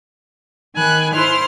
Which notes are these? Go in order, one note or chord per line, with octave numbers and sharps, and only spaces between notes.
D#3 G#5 B5 F#6
E4 C5 C6 F6